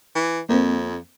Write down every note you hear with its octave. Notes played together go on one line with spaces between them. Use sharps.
E3
F2 A#3 C4